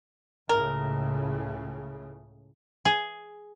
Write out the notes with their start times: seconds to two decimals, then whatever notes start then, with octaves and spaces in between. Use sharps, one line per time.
0.49 C#2 A2 C#3 A#4
2.85 G#4